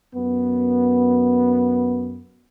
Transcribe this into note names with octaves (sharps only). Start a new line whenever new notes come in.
F#2 B3